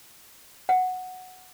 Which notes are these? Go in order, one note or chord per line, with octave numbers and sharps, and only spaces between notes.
F#5